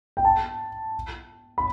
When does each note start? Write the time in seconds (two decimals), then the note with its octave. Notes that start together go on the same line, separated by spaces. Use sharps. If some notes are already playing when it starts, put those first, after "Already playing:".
0.17 G5
0.25 A5
1.58 B5